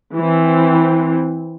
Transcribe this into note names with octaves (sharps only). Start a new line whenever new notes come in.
E3 C4